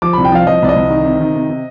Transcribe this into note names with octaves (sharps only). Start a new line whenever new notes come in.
F3 D6
C2 B5
G5
F3 F5
F3 D#5
C2 D5
D#5
C2
D#3
C3
D#3
C3
C3